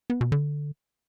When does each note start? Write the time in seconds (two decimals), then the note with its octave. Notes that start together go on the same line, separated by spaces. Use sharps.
0.10 B3
0.21 B2
0.32 D3